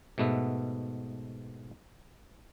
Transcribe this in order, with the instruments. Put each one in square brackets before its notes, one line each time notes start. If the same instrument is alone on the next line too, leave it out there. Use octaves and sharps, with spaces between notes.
[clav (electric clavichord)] G#2 B2 A3 B3 E5